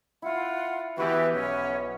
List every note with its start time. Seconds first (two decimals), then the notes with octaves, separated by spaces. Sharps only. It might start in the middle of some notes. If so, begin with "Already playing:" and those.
0.22 E4 F4 F#5
0.98 E3 B3 F#4 G4 B4 G5
1.33 B1 C#4